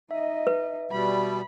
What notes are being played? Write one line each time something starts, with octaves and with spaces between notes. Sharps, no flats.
D#4 D#5 E5
B4
B2 G3 B5